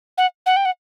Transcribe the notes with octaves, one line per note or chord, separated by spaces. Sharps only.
F#5
F#5
G5
F#5